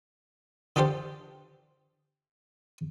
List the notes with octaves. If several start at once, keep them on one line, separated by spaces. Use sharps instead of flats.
D3 D4 F4 G4 A4 C5